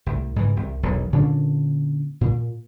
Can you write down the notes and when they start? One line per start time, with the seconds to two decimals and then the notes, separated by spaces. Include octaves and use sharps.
0.06 C2 A2
0.36 G#2 C#3 E3
0.57 C2 C3
0.83 E1 B1
1.13 A#2 D3 C#4 D4
2.21 A#2